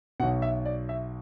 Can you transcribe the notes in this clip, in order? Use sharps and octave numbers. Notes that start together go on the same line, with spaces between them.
B1 B2 F#5
E5
D5
E5